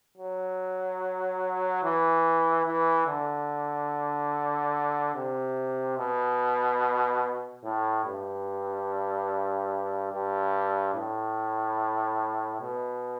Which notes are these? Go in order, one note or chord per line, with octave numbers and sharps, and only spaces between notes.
F#3
E3
E3
D3
C3
B2
A2
G2
G2
A2
B2